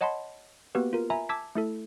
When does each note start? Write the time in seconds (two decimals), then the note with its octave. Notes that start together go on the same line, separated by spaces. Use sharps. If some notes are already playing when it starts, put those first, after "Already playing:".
0.01 C#5 D#5 F#5 A5 B5 C6
0.75 A#3 B3 F#4 G4 B4
0.93 F4 A#4
1.10 E5 G#5 A#5 B5
1.29 A5 D6 E6 G#6 B6
1.55 A3 E4 A4